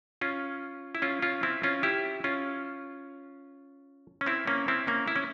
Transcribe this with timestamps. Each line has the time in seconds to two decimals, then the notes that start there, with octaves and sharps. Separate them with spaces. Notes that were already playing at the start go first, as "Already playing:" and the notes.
0.21 C#4 F4
0.95 E4
1.02 C#4 F4
1.22 C#4 F4
1.43 C4 E4
1.63 C#4 F4
1.83 E4 G4
2.24 C#4 F4
4.21 C#4
4.26 C4 E4
4.47 A#3 C#4
4.68 C4 E4
4.87 A#3 C#4
5.08 E4
5.16 C#4